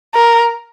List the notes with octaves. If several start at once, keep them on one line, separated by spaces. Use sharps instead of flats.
A#4